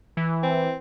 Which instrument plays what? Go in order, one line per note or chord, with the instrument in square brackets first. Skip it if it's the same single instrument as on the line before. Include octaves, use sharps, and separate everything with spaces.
[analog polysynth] E3
[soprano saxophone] C4